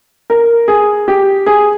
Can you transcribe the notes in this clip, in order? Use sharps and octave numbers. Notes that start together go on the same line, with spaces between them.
A#4
G#4
G4
G#4